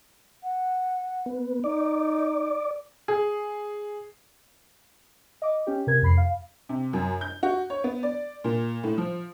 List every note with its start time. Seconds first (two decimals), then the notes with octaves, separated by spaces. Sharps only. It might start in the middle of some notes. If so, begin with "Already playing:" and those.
0.43 F#5
1.26 B3
1.64 D#4 D5
3.08 G#4
5.42 D#5 D6
5.67 C#4 G4
5.87 C3 A#4 G#6
6.02 F2 B5 C7
6.17 F5
6.69 C3
6.93 F#2
7.21 G6
7.43 F#4
7.70 C#5
7.84 B3
8.03 D5
8.44 A#2
8.83 A2
8.98 F3